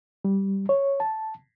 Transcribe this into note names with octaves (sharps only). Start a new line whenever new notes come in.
G3
C#5
A5